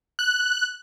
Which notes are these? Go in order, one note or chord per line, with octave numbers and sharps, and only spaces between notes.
F#6